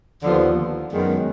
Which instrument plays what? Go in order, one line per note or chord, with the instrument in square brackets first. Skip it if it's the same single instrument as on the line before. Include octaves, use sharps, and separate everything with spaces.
[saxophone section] D#2 D3 F3 B3
F#2 D#3 G#3 B3